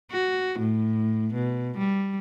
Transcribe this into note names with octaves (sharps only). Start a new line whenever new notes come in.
F#4
A2
B2
G3